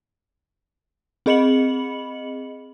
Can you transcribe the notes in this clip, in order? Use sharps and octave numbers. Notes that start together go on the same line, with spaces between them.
C4 G#4 D#5 B5 C#7 F#7